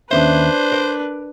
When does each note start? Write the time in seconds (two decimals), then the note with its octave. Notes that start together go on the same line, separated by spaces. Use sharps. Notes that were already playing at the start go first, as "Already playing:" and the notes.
0.11 D#2 C#4 D4 B4 C5 E5
0.72 A#4 D5